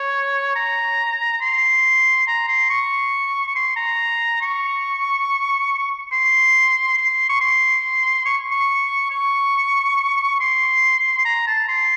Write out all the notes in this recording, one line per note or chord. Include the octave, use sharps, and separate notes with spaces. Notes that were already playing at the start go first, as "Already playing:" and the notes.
Already playing: C#5
A#5
C6
A#5
C6
C#6
C#6
C6
A#5
C#6
C6
C6
C#6
C6
C#6
C#6
C#6
C6
A#5
A5
C6